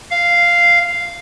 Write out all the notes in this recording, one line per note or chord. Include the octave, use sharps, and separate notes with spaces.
F5